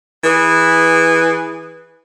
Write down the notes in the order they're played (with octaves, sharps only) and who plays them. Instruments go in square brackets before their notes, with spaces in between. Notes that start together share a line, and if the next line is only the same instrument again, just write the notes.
[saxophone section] E3 G#4 B4